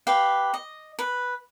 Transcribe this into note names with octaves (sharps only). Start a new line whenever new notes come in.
G4 B4 F5
D#5
B4